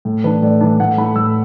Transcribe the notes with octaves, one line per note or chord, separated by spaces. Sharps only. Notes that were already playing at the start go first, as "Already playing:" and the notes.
A2
E3 D4 B4
A2 D5
E3 D4 D5
A2 F#5
A3 E4 B5
A2 E6